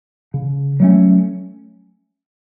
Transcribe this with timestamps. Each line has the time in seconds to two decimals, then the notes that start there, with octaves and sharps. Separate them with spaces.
0.34 C#3
0.80 F#3 A3 C#4